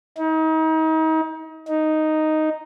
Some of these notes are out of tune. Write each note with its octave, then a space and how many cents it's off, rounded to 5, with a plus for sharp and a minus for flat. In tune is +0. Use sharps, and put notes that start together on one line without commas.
D#4 +35
D#4 +0